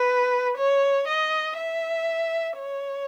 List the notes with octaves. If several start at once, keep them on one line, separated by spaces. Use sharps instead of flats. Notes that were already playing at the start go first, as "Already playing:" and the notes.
Already playing: B4
C#5
D#5
E5
C#5